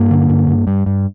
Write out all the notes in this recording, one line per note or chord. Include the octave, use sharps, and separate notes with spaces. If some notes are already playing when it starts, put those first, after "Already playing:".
Already playing: G2 A#3
D3
G2
G2
G2
G2